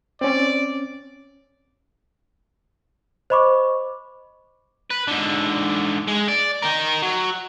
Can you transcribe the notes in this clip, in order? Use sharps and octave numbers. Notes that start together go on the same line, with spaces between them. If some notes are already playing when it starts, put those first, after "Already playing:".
C4 C#4 D5
C5 D#5 B5 C#6 D6
B4
G#2 D3
G#3
D5
D#4 A#4
F#3